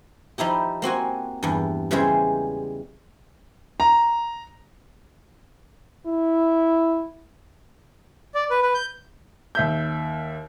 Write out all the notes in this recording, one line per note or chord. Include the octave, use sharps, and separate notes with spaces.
F3 D#4 E4 G4
A#3 C4 F#4 G#5
E2 G2
C#3 E3 G3 G#3 G#4 C5
A#5
E4
D5
B4
B4
G6
D#2 E5 G6